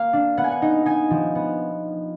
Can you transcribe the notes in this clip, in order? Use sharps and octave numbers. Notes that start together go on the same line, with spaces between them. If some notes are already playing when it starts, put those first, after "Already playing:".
Already playing: A#3 F5
D4
B3 F#5
G#5
F#5
D#4
D#4 G#5
F3
B3